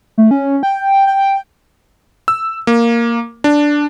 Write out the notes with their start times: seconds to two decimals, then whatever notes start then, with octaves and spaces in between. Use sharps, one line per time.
0.18 A3
0.31 C#4
0.63 G5
1.07 G5
2.28 E6
2.67 A#3
3.44 D4